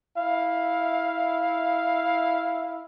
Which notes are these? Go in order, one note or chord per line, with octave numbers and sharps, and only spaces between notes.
E4 E5 F5